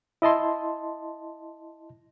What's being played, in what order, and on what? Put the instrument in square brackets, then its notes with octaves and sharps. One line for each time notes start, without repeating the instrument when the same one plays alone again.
[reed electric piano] E4 D#5 A5 C6